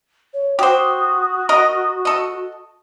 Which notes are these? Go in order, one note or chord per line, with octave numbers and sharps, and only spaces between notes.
C#5
F#4 G4 C5 D#6
A#4 D#5
A4 D#5